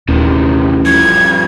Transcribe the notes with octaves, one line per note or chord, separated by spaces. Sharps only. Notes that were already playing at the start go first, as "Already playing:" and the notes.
D#1 A1 C3 D#3
G2 F3 G#6